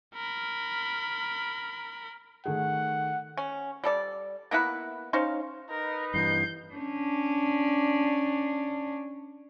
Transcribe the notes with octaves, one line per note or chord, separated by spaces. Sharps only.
A#4 B5
D#3 A3 G#4 F#5
C#4
G3 A4 D5
A#3 B3 E4 B4
C#4 D#4 C5 F5
D#4 A#4 B4
G2 E3 G6 C7
C#4 D4